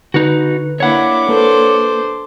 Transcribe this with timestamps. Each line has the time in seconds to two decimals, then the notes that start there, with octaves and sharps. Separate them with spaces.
0.14 D3 D#4 F#4 B4 F#6
0.80 A#3 D4 E4 C#5 F#5 D6
1.29 A#3 A4 B4 C5